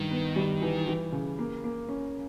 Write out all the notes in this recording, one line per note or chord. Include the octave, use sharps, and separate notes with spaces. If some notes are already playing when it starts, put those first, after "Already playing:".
Already playing: G2 D#3
B3
G3
E3
E3
C#3
A#3
A#3
C#4